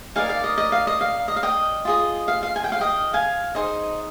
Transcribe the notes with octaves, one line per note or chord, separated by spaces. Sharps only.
D#4 A#4 D5 F5 G#5
F5
D#5
D#5
F5
D#5
F5
D#5
F5
D#5 G5
F4 G#4 D#5
F5
F5
G#5
G5
F5
D#5 G5
F5 G#5
D#4 G#4 C5 D#5